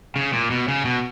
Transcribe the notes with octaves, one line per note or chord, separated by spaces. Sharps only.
C#3
A#2
B2
C#3
B2